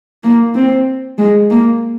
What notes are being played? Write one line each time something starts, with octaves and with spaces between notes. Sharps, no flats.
A#3
C4
G#3
A#3